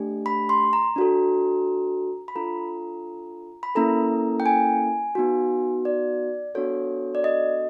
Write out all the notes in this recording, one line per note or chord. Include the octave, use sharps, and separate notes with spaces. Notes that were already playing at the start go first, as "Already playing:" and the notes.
Already playing: A3 D4 G4
B5
C6
A#5
D4 F#4 A4
B5
D4 F4 A4 A#5
B5
A#3 C#4 E4 A4 A#5
G5
G#5
B3 D#4 F#4
D5
B3 D4 F#4 A4 C#5
D5
D#5